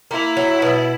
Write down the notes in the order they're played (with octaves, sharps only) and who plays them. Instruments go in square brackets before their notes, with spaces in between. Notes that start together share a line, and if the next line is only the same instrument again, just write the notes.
[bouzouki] A#3 [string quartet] E4
[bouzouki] F#3
B2